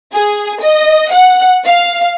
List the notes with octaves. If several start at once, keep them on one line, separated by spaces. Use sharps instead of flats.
G#4
D#5
F#5
F5